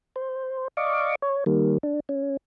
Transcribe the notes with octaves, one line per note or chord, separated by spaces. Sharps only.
C5
D5 D#5 F5 C#6 D6
C#5
D#3 G3 A#3
D4
C#4